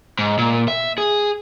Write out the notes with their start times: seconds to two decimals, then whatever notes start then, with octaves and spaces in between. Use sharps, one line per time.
0.19 G#2
0.38 A#2
0.68 E5
0.98 G#4